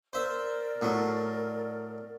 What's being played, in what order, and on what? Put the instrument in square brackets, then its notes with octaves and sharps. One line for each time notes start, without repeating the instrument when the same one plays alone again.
[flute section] A#4 D5 [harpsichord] C5 E5
[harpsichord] A2 F#3